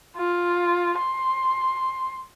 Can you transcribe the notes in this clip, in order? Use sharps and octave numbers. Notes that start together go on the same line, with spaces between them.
F4
C6